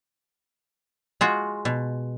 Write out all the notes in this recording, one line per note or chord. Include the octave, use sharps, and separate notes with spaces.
G#3 F4 F#4
B2